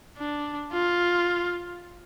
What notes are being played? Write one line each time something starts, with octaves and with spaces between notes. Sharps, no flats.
D4
F4